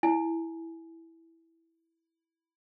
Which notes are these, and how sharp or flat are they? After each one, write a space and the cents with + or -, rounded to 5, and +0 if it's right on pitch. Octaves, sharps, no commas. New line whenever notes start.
E4 +0 G#5 +20